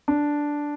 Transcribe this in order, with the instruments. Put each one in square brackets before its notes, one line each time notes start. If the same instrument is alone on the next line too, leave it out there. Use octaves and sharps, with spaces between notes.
[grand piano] D4